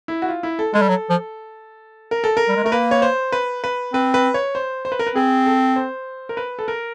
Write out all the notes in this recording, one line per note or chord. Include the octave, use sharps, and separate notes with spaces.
E4
F#4
F4
E4
A4
G#3 A4
G3
F#3
F3
A#4
A4
A#4
G3
G#3
A3 A#4
A#3 B4
C#5
C5
B4
B4
C4 B4
B4
C#5
C5
C5
B4
A#4
B4
C4 G#4
A4
C5
A#4
B4
A4
A#4